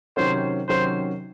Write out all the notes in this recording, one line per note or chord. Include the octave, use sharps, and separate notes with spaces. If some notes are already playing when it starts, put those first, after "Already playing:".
C3 D#3 F#3 C#4 C5
C3 D#3 F#3 C#4 C5